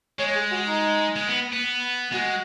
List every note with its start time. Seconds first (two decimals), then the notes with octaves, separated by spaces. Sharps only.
0.19 G#3 C#5
0.35 G#4
0.51 F#4
0.67 D#4
1.16 G#3
1.28 B3
1.53 B3
2.13 G#3 F#4